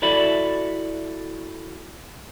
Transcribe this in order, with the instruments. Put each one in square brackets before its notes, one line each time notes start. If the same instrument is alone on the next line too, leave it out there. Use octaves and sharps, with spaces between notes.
[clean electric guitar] E4 F#4 A4 D5 E5 B5